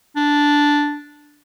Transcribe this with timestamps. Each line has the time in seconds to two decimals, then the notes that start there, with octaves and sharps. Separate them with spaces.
0.16 D4